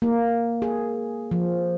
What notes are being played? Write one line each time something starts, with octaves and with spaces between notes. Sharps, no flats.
A#3
G#4
F3